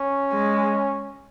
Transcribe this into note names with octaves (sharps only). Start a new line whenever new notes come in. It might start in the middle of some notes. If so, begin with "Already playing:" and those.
Already playing: C#4
G#3